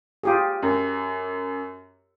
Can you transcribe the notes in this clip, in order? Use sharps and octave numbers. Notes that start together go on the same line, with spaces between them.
F4 G4 G#4
F#2